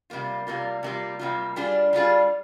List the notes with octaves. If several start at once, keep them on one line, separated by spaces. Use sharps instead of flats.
C3 G3 A#3 F4
C3 G3 A#3 F4
C3 G3 A#3 F4
C3 G3 A#3 F4
G3 D4 F4 G#4
G3 D4 F4 G#4